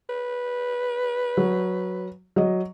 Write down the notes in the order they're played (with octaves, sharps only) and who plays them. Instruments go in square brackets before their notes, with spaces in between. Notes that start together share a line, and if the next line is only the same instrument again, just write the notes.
[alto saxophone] B4
[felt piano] F#3
F#3 D#5